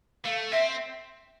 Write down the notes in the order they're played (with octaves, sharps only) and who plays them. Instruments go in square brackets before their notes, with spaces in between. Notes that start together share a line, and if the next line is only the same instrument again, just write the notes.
[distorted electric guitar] A3 [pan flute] F5
[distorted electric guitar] C4 [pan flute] E5